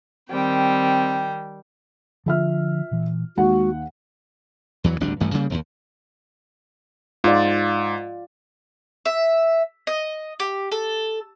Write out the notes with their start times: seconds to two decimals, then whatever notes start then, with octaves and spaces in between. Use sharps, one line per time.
0.30 D#3 G3 C4 G5
2.26 D3 F3 F4 E5 F6
2.91 A#2 E3
3.37 D#2 G#3 F#4 F#5
4.84 E2 E3 F#3
5.00 G#1 D2 G3 D4
5.20 A1 G2 E3 A3
5.34 C#3 G3 A#3
5.50 E1 D#2
7.24 G#2 F4 D5
9.05 E5
9.87 D#5
10.40 G4
10.72 A4